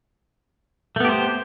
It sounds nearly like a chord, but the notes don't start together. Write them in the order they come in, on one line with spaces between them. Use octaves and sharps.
A3 B3 G4 C5